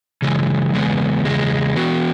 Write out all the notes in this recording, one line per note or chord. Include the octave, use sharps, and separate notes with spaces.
C#3 E3 G#3
E2 C#3 G#3 B3
E2 C#3 G#3
E3 B3 F#4